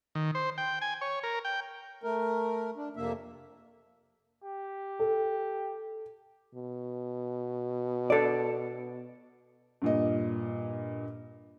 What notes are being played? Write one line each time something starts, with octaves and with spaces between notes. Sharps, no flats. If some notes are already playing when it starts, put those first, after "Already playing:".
D#3
C5
G5
G#5
C#5
A#4
G5
A3 A#4
D4
F2 C3 A#3 E5
G4
A4
B2
A4 D5
G2 A#2 D#5